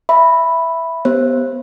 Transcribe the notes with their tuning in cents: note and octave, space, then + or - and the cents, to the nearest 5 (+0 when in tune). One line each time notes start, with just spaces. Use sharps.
E5 +0 B5 +0
B3 +0 G4 +0 C5 +25